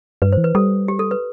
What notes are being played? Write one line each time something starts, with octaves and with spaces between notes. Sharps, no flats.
G2 B4
C5
E3
B4
G3 A4
G4
A4
B4